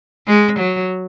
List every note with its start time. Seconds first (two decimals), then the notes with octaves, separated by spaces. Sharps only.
0.27 G#3
0.59 F#3